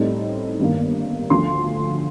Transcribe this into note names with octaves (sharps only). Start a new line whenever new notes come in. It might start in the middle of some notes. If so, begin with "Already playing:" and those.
Already playing: A2 G3 C4 D#4
G1 G2 D#3 A#3
D2 D3 F3 C6